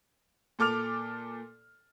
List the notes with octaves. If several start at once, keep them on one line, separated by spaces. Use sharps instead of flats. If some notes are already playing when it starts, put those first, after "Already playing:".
A#2 A4 D6 F6 F7